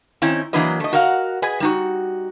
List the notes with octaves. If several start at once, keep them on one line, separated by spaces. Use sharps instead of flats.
D#3 C4 C#4 D#4 E4
E3 F#3 A#3 D4 B4 D#5
A3 D#5
F#4 A#4 D#5 F5 F#5
G#4 B4 D#5 G#5
G3 D#4 F#4